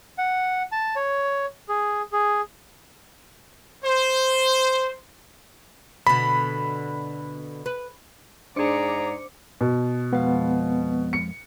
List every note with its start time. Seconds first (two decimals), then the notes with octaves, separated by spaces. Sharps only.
0.18 F#5
0.72 A5
0.96 C#5
1.69 G#4
2.12 G#4
3.84 C5
6.07 B2 D3 B5
7.66 B4
8.56 G#2 D4 G#4 C5 D5 A#5 D6 C#7
9.61 B2
10.13 F2 G#3 B3 F5
11.13 C#7